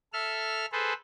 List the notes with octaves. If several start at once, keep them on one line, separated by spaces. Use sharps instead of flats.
A4 E5 F6
G#4 A4 B4 C5